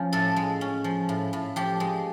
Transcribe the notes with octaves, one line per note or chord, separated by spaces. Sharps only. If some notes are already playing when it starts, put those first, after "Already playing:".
Already playing: F3 C#4
A2 A4
G#3
C#4
F3
A2
A2
F3 G4
G#3